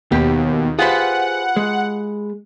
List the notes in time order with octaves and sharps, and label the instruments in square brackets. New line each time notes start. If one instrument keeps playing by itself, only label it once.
[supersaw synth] D#2 [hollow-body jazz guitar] B2 [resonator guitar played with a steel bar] G4
[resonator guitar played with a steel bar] F4 G4 B4 [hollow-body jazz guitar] G#4 C5 [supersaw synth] F#5
[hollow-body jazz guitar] G#3